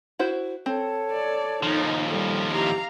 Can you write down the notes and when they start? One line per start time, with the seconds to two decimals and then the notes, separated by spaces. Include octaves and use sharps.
0.19 E4 F#4 C5
0.66 C4 A4 C#5 A5
1.11 D5
1.63 D#2 F3 D#4
2.09 G3 A4
2.52 E4 G4 F5 A#5